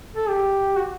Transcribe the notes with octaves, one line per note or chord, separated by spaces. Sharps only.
A4
G4
F#4